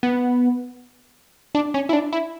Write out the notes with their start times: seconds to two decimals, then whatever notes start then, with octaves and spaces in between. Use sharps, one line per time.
0.03 B3
1.55 D4
1.74 C#4
1.89 E4
1.93 D4
2.13 E4